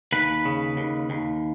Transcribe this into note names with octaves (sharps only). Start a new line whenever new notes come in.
D#2 B4
C#3
D#2
D#2